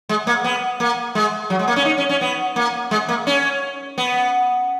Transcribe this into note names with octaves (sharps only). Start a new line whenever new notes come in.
G#3
A#3
B3
A#3
G#3
F#3
G#3
A#3
C#4
D#4
C#4
C#4
B3
A#3
G#3
A#3
C#4
B3